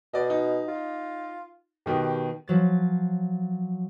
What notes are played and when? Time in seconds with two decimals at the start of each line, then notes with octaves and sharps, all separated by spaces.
0.14 B2 D5 D#5
0.30 D#4
0.68 F4
1.86 B2 D#3 B3 G4
2.48 F3 F#3 A6